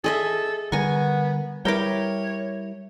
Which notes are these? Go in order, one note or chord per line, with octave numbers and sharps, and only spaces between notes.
G#4 A4 D#5 E5
D3 G3 B3 A#4 G#5 C#6
G3 E4 A#4 B4 C#5 G5 D6